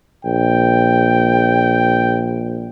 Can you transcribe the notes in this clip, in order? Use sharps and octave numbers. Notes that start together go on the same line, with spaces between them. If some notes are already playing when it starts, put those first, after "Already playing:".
A#1 G5